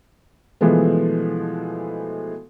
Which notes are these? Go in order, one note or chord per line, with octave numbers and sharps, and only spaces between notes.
B2 E3 F3 G#3 A3 B3